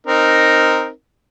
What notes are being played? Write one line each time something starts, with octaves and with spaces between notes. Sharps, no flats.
C4 D#4 A#4